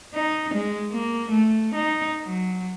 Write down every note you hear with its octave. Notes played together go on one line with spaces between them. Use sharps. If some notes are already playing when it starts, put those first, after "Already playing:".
D#4
G#3
A#3
A3
D#4
F#3